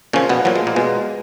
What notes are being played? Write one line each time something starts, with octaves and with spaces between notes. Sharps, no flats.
A#2 C#3 F3 C#4
B2 B3
A#2 F3 F#3
G#3
A#2 A#3
B2 G#3